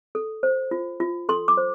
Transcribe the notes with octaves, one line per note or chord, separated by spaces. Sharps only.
A4
C5
F4
F4
A4 C6
D6
C5